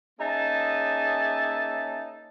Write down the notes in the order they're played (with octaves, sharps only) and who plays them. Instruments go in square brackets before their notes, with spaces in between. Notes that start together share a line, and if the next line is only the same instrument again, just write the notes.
[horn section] A#3 C#4 D#4 G#4 E5 A5